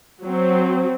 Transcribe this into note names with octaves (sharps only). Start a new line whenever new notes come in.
F#3 C4